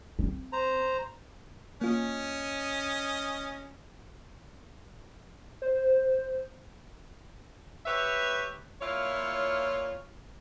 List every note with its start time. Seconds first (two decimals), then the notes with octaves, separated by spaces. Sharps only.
0.19 C4
0.53 C5 A#5
1.81 A#3 C#4 F4 D#5
5.62 C5
7.86 G4 B4 C#5 E5
8.81 A#2 E4 F4 C#5